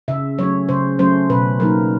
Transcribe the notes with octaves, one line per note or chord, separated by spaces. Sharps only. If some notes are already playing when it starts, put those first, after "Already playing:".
C#3 E5
F#3 A3 C#4 C#5
C#3 C5
F#3 A3 C#4 C5
B2 B4
F#3 A#3 D#4 A#4